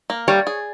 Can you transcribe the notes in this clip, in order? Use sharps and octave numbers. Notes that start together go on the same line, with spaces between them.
A#3
G3 C#5
G#4